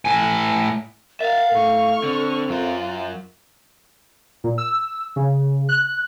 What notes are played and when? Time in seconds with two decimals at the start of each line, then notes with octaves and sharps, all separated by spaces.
0.05 A2 G#5
1.21 A#4 E5 F5 A6
1.52 A2 A4 C#6 F6
2.03 D3 C4
2.49 F#2 F4 A#4
4.44 A#2
4.58 E6
5.16 C#3
5.69 F#6